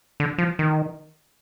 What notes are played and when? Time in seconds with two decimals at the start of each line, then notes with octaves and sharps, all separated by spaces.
0.20 D3
0.38 F3
0.59 D#3